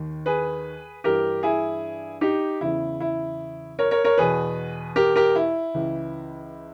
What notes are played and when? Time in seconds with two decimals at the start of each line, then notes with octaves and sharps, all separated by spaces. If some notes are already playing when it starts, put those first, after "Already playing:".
Already playing: D#2 D#3
0.26 G#4 B4
1.04 G2 E3 G4 A#4
1.43 E4 G#4
2.21 D#4 G4
2.61 E2 C#3 E3 E4
3.00 E4
3.79 A#4 C#5
3.91 A#4 C#5
4.04 A#4 C#5
4.18 E2 B2 G#4 B4
4.96 G4 A#4
5.16 G4 A#4
5.35 E4
5.74 C#2 C#3 E3